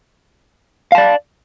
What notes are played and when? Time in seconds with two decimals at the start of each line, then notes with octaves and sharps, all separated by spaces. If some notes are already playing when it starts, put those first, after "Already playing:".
0.92 F5
0.95 A5
0.98 D5